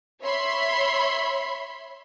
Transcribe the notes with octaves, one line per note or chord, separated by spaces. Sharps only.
C#5 E5 B5 C6